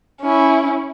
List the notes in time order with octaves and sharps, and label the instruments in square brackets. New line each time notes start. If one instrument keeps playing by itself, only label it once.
[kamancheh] C#4 E4